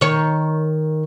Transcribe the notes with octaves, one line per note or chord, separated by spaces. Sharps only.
D#3 C#5